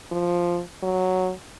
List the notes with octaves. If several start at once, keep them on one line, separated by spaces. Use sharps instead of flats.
F3
F#3